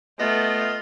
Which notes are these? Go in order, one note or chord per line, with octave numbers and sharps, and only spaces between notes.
A3 B3 F4 D#5